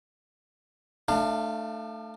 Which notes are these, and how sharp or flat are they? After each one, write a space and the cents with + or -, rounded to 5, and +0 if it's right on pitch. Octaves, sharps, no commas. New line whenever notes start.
A3 +0 D4 +35 F5 -10